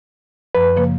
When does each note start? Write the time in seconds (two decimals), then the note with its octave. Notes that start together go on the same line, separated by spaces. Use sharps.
0.55 F#2 F3 B4
0.76 C#3 F3 A#3